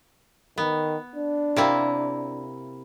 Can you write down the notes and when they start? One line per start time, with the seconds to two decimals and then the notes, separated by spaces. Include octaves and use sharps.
0.58 D#3 B3
1.16 D4
1.56 C3 A#3 E4